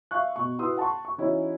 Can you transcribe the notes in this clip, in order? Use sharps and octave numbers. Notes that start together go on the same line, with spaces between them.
E5 F5 C#6 F#6
B2 C#6
E4 F#4 B4 C6 D#6 E6
F#5 A5 C6 C#6
C#6
E3 C#4 D#4 E4 F#4 C#5